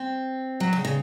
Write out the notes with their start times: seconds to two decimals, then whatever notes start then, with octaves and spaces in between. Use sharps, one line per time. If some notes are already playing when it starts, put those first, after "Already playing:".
Already playing: C4
0.60 F#3
0.73 C#3
0.85 C#3